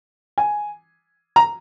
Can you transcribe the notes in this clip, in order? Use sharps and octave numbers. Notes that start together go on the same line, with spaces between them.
G#5
A#5